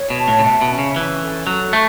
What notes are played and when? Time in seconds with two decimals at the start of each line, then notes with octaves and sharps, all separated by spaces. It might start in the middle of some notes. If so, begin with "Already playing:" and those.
Already playing: C#5
0.10 B2
0.19 A5
0.28 A2
0.39 C#3
0.44 B2 E5
0.61 B2
0.70 C#4
0.79 C#3
0.96 E3 C#4
1.22 A4
1.47 F#3 A4
1.73 A3 C#6